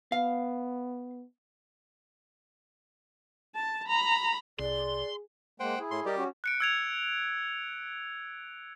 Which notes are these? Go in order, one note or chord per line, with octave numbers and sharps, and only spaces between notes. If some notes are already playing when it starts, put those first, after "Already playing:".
B3 F5
A5
A#5 B5
C2 G#4 D5 C6
G#3 A#3 C5 F#5 G5
E4 G#4
A2 C6
G3 G4 A#4 D5 D#5
C#4 F#4
F#6 C#7 D7
E6 G#6 F7